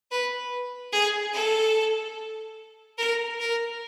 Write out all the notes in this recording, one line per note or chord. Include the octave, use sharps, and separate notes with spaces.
B4
G#4
A4
A#4
A#4